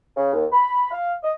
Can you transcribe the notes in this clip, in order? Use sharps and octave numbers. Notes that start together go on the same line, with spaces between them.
C#3
D#2
B5
F5
D#5